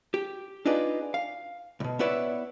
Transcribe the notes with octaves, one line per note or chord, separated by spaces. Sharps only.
G4
D4 D#4 F4 G#4 B4 D5
F5
C2 B2
B3 E4 B4 C#5 D5 E5